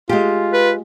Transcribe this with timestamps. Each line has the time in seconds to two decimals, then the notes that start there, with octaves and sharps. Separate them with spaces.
0.09 G#3 F4 G4
0.53 B4